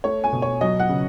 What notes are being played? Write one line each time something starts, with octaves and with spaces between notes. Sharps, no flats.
A3 C#5
G#5
B2
C#5
F#3 D#5
F#5
C#3